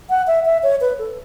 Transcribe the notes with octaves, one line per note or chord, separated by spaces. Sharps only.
F#5
E5
E5
C#5
B4
A4